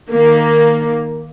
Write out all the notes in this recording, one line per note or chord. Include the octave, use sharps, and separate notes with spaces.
D#3 A#3